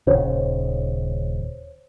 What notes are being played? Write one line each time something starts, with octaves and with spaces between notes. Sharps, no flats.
D#1 D#2 C#3 C5 C#5